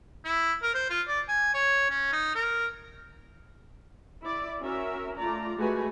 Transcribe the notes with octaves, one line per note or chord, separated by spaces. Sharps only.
E4
A#4
C5
F4
D5
G#5
C#5
C#4
D#4
A#4
E4 D5
C#4 F#4 A#4 E5
A3 F4 D5 A#5
G#3 A3 F#4 B4 G#5